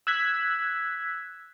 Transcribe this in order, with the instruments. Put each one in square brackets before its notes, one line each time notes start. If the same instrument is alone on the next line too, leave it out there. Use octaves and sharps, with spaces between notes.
[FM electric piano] E6 F#6 G#6 B6